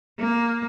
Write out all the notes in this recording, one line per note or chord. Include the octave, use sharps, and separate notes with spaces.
A#3